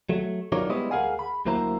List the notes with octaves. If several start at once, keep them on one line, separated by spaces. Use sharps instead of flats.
F#3 A3
F#3 D#4 F4 A#4 C#5 D5
G3 G#3 B3 E4 C5 D#5
D2 G#4 A#4 F5 F#5 G#5
B5
D2 F#3 A#3 E4 C5 A#5